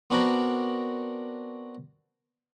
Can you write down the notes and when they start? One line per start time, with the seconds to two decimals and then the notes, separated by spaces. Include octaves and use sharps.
0.10 B3 C4 D4 F#4 A#4 B4